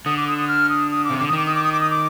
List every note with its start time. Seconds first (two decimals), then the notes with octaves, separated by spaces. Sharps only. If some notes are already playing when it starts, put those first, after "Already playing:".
0.06 D3 D#6
0.17 D6
0.28 D#6
0.38 D#6
0.48 F6
0.69 D#6
0.91 D#6
1.05 C3 D6
1.19 D3 D6
1.28 D#6
1.33 D#3 D6
1.46 D#6
1.55 D6
1.64 D#6
1.72 D6
1.81 D#6
1.90 D6